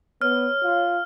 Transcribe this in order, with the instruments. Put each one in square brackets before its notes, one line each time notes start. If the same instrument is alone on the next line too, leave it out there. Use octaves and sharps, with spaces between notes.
[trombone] B3 [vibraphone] C#5 [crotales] F6
[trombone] F4